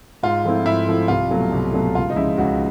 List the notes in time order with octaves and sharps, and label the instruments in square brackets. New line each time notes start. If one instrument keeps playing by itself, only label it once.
[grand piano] G#2 [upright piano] F4
[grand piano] F3 A3 C4 E4
[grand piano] G#2 [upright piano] E4
[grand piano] F3 A3 C4 E4
[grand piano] C2 [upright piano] F4
[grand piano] B2 F#3 A3
C2
B2 F#3 A3
[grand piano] C#2 [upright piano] F4
[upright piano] D#4
[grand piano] C#3 F3 G#3 [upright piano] E4
[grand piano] C#2 [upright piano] F#4